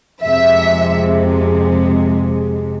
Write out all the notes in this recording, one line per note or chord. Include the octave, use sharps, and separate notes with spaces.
F2 C3 G#3 E5